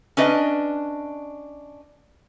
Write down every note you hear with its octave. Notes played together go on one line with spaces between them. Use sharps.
C#4 D4 B4 D#5